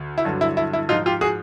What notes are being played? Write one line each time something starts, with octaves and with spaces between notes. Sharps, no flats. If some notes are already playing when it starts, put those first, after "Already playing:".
Already playing: D2
E4
G2 D3 F#3
E4
E4
E4
G#2 F3 D#4 F4
F4 G4
F#4 G#4